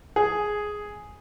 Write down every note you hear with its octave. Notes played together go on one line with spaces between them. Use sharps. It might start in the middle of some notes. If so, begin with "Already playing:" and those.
G#4